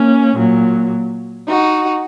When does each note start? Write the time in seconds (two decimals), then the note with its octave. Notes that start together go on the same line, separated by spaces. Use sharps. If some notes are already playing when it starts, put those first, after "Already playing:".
Already playing: A#3 C#4
0.35 A#2 F#3
1.49 D#4 F#4